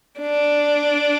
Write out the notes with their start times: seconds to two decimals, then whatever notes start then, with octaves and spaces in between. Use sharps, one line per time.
0.20 D4